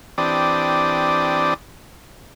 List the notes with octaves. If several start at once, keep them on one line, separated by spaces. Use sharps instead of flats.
E3 C4 D4 G4 D5 D#6